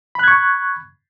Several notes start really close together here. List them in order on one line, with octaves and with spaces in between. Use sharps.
B5 F#6 G#6 C#6